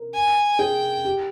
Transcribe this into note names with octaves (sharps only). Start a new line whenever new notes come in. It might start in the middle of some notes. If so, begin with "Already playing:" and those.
Already playing: A#4
G#5
G#4 G5
G4